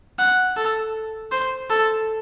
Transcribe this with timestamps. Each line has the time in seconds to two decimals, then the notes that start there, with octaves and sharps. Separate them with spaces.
0.19 F#5
0.57 A4
1.32 C5
1.70 A4